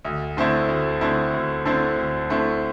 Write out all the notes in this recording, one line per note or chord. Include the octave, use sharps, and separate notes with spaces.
D2
D3 A3 C4 E4
D2
D3 A3 C4 E4
D2
D3 A3 C4 E4
D2
D3 A3 C4 E4